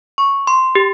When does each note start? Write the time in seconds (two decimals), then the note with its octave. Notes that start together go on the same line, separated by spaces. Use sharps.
0.18 C#6
0.47 C6
0.75 G4